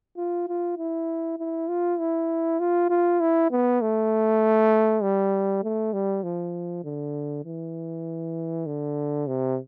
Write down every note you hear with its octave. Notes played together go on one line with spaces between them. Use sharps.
F4
F4
E4
E4
F4
E4
F4
F4
E4
B3
A3
G3
A3
G3
F3
D3
E3
D3
C3